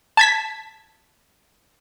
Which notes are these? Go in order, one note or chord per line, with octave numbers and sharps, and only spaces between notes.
A5 G#6 B6